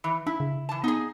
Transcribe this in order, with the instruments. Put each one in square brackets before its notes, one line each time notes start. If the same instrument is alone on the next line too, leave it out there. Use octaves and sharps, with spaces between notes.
[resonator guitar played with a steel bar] E3
[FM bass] D4 [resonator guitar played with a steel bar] E4
[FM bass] C#3
[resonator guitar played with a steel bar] E3 A5
[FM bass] B3 [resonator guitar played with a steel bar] D#4 G#4